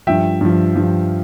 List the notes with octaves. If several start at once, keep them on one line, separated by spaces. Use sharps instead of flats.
G2 F3 E5 G5
G2 F3
G2 F3